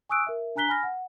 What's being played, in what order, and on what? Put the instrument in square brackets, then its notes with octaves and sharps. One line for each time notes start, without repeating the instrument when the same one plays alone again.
[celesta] G#5 C#6 D#6 E6 F#6 D7
A#4 E5
D4 G#5 A#5 F#6 B6 G7
G#5 B5 F6 A#6
F#5